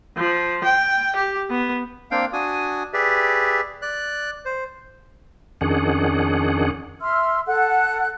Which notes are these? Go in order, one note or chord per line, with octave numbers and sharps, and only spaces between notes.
F3
G5
G4
B3
A#3 C4 D4 F5 G5
D4 F#4 G#5 D#6
G4 G#4 B4 D5 E5
D5 F#6
C5
F2 D#3 C#4 D4 G#4 F#5
E5 C6 E6 F6
A4 F#5 F#6